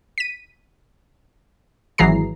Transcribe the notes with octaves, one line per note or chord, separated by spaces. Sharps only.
B6 D#7
G#1 E3 F#3 G#4 A#5 C7